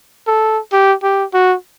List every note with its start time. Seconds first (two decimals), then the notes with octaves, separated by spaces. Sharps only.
0.27 A4
0.73 G4
1.03 G4
1.34 F#4